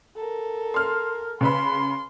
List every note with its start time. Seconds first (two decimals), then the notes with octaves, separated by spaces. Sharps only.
0.16 A4 A#4
0.74 C6 F6
1.41 C#3 B4 B5 C6